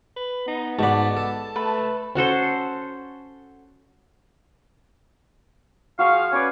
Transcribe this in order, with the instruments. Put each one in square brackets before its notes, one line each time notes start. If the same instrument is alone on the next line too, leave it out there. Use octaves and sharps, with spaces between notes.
[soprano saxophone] B4
[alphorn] B3 [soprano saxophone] D#4
[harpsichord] G#2 B5 [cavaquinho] F#4 D5 [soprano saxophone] A5
[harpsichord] A4
[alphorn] A3 [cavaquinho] B4
[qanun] C#4 F#4 A4 C5
[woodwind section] F3 G#4 F5 [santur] F#4 C#6
[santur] C#4 D5 [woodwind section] B4 C#5